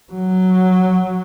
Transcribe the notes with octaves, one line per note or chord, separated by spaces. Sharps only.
F#3